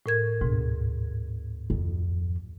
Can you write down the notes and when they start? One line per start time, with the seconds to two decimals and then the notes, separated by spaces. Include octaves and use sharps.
0.06 A2 A#4 G#6
0.41 D2 G#2 B2
1.70 F2